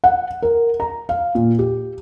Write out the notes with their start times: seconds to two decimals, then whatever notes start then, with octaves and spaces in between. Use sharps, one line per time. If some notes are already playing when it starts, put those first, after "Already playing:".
0.04 F#5
0.42 A#4
0.80 A#5
1.09 F5
1.35 A#2
1.59 G4